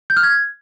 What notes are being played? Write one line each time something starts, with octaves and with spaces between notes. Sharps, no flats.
G6
F6
G#6